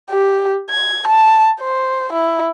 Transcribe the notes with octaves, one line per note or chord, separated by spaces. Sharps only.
G4
G#6
A5
C5
E4